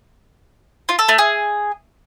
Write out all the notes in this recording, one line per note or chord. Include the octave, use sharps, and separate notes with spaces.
F4
A4
A3
G#4